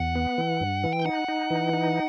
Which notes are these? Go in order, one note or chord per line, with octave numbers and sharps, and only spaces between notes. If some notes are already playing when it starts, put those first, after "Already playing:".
Already playing: E2 F#5
B3
E3
G2
E3
G5
D#4 F#5
D#4
E3
D#4